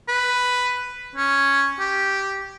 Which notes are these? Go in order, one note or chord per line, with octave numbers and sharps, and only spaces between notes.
B4
C#4
G4